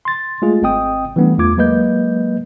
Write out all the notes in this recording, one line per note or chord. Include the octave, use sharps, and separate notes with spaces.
C6 A6
G#3 A3 F4 G#4
G#1 C4 D#5 G5 D#6
E3 G3 A3 B3 D4
E2 A3 F4 D6 G#6
F#3 G#3 A#3 B4 D#5 G6